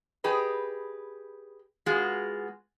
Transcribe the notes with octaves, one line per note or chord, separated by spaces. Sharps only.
G4 G#4 B4 D#5
G#3 B3 F4 F#4 G#4